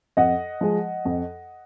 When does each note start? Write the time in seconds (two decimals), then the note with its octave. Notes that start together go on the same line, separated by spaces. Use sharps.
0.17 F2 D#5 F#5
0.61 F3 G#3
1.05 F2